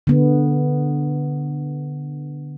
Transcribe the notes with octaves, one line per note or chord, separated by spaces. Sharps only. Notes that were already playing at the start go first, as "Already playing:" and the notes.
D3 B3